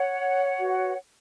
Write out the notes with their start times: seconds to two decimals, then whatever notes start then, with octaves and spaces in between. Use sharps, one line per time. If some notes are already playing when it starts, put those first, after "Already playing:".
Already playing: C#5 F#5
0.59 F#4 B4